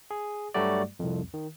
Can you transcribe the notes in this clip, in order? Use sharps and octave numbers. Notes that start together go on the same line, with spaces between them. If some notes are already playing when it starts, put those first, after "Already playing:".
G#4
G2 F#3 G3 A3 F#4 D5
C2 F2
D#3